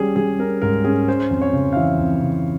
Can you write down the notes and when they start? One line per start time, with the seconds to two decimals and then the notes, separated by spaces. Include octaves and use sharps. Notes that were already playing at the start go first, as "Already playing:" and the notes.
Already playing: G3 C#4 G#4
0.16 G3 G#4
0.39 C#4 A#4
0.62 G#2 A#4
0.84 C#4 G#4
1.08 G#3 C5
1.31 F2
1.42 C#5
1.53 C#3
1.73 F5
1.76 E3 E5
1.99 F2
2.22 C#3